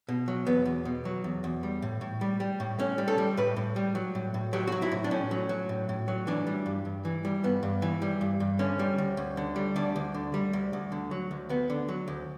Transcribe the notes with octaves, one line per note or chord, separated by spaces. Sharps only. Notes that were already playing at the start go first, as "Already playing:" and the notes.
B2
F#3
E2 B3
E2
B2
F#3
E2
E2
G3
A2
A2
G3
G3
A2
A2 C#4
G3
A4
G3
A2 B4
A2
G3
F#3
A2
A2
F#3 G4
F#3 F#4
E4
A2
D4
A2 C#4
F#3
F#3
A2
A2
F#3
E3 D4
G3
G2
G2
E3
G3
G2 B3
G2
E3
G3
G2
G2
D3 C#4
G3
D2
D2
D3
G3
D2 D4
D2
D3
G3
D2
D2
D3
F#3
D2
D2 B3
D3
F#3
D2